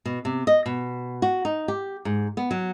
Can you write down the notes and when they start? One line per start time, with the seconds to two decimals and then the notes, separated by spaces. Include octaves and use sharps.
0.05 B2
0.25 C3
0.47 D#5
0.66 B2
1.22 F#4
1.45 D#4
1.68 G4
2.05 G#2
2.37 B3
2.51 F#3